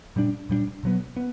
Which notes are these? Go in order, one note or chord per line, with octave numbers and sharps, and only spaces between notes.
A#2 G3 B3 D4
A#2 G3 B3 D4
B2 F#3 B3
B3